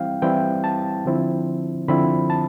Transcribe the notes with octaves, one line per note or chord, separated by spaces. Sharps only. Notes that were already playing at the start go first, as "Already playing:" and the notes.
Already playing: E3 G3 C4 E4 F5 G5
E3 G3 C4 E4 G5
A5
D3 F3 C4 E4
D3 F3 C4 E4 B5
A5